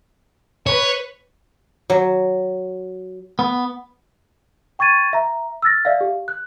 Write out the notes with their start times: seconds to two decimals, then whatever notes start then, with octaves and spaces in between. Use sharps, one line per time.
0.67 B4 C#5
1.90 F#3
3.39 B3
4.79 G5 C#6 G#6 A6 D#7
5.13 E5 A#5
5.62 E6 F6 A6 A#6
5.85 D5 E5 F5
6.01 G4
6.28 F#6